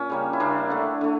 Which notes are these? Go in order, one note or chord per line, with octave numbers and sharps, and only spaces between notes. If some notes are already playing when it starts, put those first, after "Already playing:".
Already playing: A#2 C#4
C#3 G3 A#3
E4
C#3 G3 A#3 D4
D3 A3
D3 A3